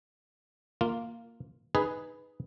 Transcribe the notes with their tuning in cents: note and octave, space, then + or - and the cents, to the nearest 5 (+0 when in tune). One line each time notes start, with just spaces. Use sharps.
A#3 -10 F4 +0
D#4 +0 G#4 +0 B4 +0